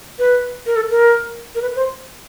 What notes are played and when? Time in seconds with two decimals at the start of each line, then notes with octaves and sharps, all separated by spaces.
0.19 B4
0.66 A#4
0.76 A4
0.91 A#4
1.55 A#4
1.62 B4
1.76 C5